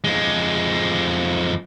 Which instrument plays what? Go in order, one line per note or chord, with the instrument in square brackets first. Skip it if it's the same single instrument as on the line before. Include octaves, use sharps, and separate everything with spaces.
[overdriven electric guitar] F2 G#3